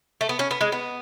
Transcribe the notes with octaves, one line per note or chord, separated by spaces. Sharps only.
A3
B3
C#4
B3
G#3
B3